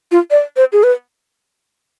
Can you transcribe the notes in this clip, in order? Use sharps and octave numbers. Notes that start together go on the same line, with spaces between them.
F4
D5
C5
G#4
B4